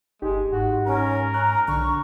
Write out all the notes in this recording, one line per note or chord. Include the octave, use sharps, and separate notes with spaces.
G1 G#3 D#4 G4
G#2 F#4
C#4 A#4
A#5 F#6
B1 D3 C#6